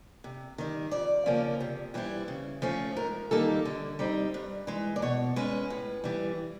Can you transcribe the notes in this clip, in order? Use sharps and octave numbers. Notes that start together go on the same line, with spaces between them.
C3
D#3 G3
F2 D5
C#3 F3 A#3 C#4
C3
E3 G3 C4 E4
C#3
F3 A3 C#4
G#2 A#4
D#3 G3 A#3 D#4 A4
D3
G3 C4 D#4
G2
E3 G#3
D5
B2 C#5
G#3 C#4 B4
A2
E3 G3